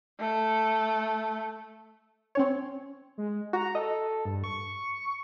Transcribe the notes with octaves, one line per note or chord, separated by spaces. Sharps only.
A3
C4 C#4 C#5
G#3
F#4 A#5
A4 D#5
G2
C#6